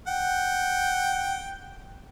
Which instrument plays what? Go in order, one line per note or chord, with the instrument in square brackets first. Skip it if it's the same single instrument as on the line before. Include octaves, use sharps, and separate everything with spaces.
[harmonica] F#5 G5